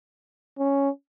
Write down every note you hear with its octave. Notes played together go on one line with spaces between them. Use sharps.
C#4